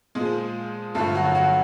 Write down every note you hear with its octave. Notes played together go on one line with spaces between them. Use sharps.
A#2 F3 G#3 G#4
G2 D3 F3 A3 A4
F#3 F#4
F#3 F#4